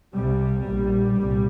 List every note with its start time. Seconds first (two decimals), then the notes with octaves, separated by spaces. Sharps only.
0.15 C2 C3 G3
0.66 A#1 A#2
1.19 C2 A#2